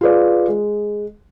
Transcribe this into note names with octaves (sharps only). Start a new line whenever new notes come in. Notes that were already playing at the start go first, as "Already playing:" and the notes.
F4 G#4 B4 D5 F5
G#3